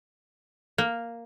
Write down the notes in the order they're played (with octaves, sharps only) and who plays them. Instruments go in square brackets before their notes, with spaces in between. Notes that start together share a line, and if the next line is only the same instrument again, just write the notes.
[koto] A#3